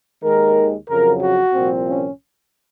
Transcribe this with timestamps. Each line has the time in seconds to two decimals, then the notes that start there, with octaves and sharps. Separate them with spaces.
0.23 D#2 D#3 G#3 A#4
0.89 F2 C#3 F#3 A#4
1.22 F#4
1.54 C2 A#2 F3 C4
1.88 C#4